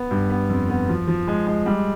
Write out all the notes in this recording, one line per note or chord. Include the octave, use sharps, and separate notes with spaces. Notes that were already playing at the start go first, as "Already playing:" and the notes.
Already playing: B3
G2
B3
F2
B3
F3
F3
G#3
G#3
G3